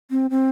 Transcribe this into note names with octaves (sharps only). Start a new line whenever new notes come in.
C4
C4